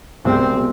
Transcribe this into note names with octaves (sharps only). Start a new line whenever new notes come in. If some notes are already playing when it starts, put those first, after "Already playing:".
C2 B2 G#3 C4
B2 G#3